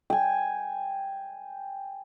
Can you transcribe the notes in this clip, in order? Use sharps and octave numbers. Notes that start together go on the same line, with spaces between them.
G5 G#5